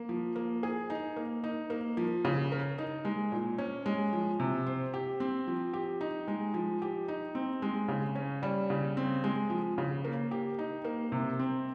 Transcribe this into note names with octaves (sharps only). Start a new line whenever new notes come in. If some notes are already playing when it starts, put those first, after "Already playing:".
Already playing: A#3
F3
A#3
G#4
D#4
A#3
D#4
A#3
F3
C#3
A#4
D#4
G#3
A#2
C#4
G#3
F3
C3
C5
G4
C4
F3
G4
D#4
G#3
F3
G4
D#4
C4
G#3
C#3
C#4
G3
C#3
C4
G#3
F3
C#3
A#3
G4
D#4
A#3
C3
C4